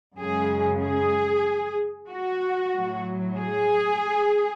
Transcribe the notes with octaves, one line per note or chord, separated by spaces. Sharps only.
F#2 C#3 G#3 G#4
G#4
F#4
A2 F#3
G#4